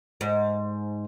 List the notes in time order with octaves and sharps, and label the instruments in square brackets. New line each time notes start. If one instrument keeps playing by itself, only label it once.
[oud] G#2